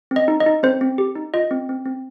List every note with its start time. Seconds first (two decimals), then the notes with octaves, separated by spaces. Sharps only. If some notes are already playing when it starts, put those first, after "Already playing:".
0.11 C4
0.16 D#5
0.28 D#4
0.40 D#5
0.46 D#4
0.63 C4 C5
0.81 C4
0.98 G4
1.15 D#4
1.34 F4 D#5
1.51 C4
1.69 C4
1.85 C4